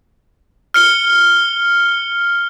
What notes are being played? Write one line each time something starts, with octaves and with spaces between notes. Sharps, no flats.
F6 C#7 G7